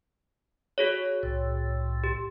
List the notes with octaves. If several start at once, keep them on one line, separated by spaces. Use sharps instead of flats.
F#4 G#4 C#5
C2 A2
G4